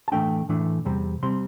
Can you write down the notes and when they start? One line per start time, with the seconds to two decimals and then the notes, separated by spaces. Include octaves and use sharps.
0.08 A5
0.12 A2 E3 A3 D4 G5
0.49 A2 E3 A3 D4
0.85 E2 C3 G3 C4
1.23 C3 G3 C4 C6